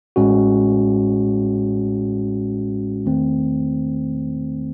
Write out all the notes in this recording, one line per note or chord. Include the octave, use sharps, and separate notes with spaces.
A1 A2 G#3 C#4 F#4
E2 D#3 A3 C4